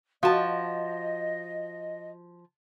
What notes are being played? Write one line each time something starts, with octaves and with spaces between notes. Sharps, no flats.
F3 F#4 D#5 F5 A5